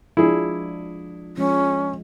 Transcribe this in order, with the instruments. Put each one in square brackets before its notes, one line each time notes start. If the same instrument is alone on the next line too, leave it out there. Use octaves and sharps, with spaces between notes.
[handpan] F3 G#3 D4 [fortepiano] E4 G#4
[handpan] F3 G#3 [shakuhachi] C#4